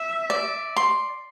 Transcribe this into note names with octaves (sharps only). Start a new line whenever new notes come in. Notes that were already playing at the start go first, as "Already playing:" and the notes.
Already playing: E5
D5
C6